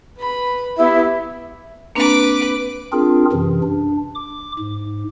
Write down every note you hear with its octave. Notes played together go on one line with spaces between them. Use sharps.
B4 B5
B3 E4 G4 E5
A#3 C4 D4 B4 D6
C4 D4 F4 G#4 A#4
F#2 C3 E3
D4
D6
G#2